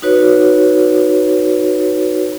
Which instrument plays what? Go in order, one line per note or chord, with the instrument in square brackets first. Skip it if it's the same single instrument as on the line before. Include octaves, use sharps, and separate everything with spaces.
[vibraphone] D#4 F#4 B4 C#5